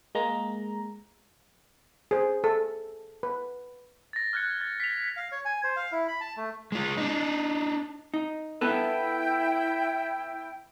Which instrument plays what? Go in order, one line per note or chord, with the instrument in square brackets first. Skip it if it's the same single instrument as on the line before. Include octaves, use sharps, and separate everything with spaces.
[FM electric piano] G#3 A#3 A#5
[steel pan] G#4 C5
A4
B4
[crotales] A6 A#6
F6 F#6 G#6 C#7
A6
B6 F7
[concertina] F5
C#5
G#5
C5
F5
E4
B5
A5
A3
[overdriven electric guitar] G#3 F4
D4 D#4
[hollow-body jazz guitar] D#4
[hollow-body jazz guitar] B3 A4 B4 [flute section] E4 G5